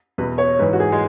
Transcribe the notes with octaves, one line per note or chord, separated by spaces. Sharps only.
E2 B2 B4
C#5
G#2 E3 B4
F#4
G#4
G#3